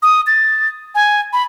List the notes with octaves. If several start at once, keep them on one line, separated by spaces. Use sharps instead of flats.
D#6
A6
G#5
B5